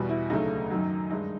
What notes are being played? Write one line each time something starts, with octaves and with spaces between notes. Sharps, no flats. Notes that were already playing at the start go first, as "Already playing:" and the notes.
Already playing: E2 B2 G3 F#4
E4
D2 C#3 F#3 A3 D#4
F#2 D#3 F#3
G2 D#3 G#3 D#4